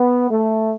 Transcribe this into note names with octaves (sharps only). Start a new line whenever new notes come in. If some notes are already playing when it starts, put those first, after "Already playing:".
Already playing: B3
A3